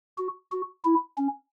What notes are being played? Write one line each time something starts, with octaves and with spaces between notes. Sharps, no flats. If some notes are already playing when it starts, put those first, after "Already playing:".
F#4
F#4
E4
C#4